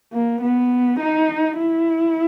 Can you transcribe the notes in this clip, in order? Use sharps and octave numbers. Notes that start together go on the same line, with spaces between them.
A#3
B3
D#4
E4